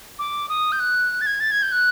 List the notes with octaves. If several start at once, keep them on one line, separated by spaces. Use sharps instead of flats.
D6
D#6
G6
F#6
A6
G#6
A6
G#6
G6
F#6